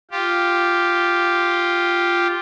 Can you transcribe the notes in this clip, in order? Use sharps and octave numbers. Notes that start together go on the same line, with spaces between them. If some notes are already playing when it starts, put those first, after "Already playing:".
F4 G4